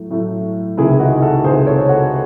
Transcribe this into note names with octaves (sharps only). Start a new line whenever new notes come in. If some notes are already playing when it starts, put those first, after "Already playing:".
Already playing: A2 F#3 A3
A2 F#3 A3
C#2 C3 D#3 E4 G#4
D#4 F#4
F#4 A4
C#2 C3 D#3 G#4 C5
A4 C#5
F#4 A4